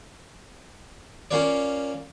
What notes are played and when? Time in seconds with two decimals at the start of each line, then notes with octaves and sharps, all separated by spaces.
1.31 A#3 C#4 F4 C#5 D5